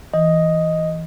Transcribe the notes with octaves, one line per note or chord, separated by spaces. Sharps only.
E3 D#5